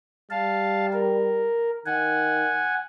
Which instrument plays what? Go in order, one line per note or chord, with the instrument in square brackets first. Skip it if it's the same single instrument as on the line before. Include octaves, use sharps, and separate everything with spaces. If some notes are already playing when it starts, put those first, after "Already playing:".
[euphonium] G3 [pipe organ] F5 A5
[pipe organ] A#4
[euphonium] D#3 [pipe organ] F#5 G#5